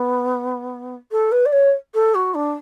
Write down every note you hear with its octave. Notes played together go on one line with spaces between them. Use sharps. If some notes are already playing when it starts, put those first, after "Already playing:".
Already playing: B3
A4
B4
D5
C#5
A4
F#4
D4